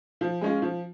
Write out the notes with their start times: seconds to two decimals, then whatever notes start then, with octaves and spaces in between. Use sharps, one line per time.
0.21 F3
0.41 G#3 C#4 F4
0.62 F3